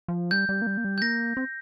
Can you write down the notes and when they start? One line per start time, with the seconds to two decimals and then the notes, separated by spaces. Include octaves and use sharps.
0.08 F3
0.31 G3 G6
0.49 G3
0.62 A#3
0.67 G3
0.77 A#3
0.84 G3
0.98 G6
1.02 A#3 A#6
1.37 C4